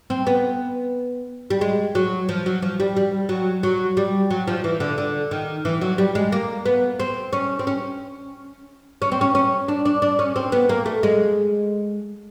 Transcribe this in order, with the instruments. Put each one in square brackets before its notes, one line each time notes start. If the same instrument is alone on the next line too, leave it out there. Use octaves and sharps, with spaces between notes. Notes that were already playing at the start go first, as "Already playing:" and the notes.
[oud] C4
B3
G3
G#3
F#3
F3
F#3
F3
G3
G3
F#3
F#3
G3
F#3
F3
E3
D3
D3
D#3
E3
F#3
G3
G#3
A#3
B3
C4
C#4
C4
C#4
C#4
C4
C#4
C#4
D4
D4
D4
C#4
C4
B3
A#3
A3
G#3